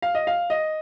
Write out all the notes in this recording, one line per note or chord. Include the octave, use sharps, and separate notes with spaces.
F5
D#5
F5
D#5